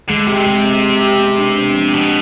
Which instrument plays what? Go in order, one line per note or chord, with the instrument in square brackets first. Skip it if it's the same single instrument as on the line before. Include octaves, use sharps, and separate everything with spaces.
[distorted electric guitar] D3 [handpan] G#3
[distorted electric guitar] C3 [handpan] G4
[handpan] G#3
C4
G4
G4
B3
D4
D4
F3
[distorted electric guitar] B2 [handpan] D4